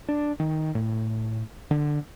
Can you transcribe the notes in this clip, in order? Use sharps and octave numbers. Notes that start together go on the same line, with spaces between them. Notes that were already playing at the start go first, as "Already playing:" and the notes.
D4
D#3
A2
D3